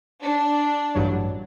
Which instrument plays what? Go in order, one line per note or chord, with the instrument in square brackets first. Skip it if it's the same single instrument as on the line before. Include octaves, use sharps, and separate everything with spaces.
[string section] D4
[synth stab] A1 G2 F#3